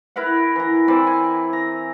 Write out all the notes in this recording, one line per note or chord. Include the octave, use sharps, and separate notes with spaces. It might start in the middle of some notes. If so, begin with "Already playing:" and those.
E4 A#4 B4 F#5
E3 A#5
E3 C4 D5
G#5
A#5